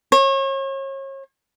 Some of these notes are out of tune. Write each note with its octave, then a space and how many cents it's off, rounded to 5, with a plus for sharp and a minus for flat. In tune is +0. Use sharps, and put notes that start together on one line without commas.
C#5 -35